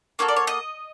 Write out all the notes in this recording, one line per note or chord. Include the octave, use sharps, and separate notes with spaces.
A#3 D#4 F#4 A4 C#5
D5
C#5
D#5